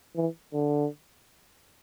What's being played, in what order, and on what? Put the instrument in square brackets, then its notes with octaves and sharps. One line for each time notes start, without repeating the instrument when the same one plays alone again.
[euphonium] E3
D3